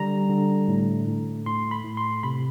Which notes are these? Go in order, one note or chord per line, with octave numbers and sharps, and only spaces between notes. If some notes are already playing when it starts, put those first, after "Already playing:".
Already playing: D3 G3 A#5
D3
A2
A2
A2 C6
B5
A2
C6
C3 B5